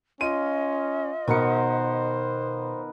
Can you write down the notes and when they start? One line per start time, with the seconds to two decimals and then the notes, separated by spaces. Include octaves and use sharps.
0.21 C#4 F4 D#5 D#7
1.28 B2 D#3 B3 A#4 C5 C#7